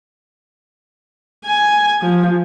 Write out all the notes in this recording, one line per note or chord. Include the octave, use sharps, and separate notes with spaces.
G#5
F3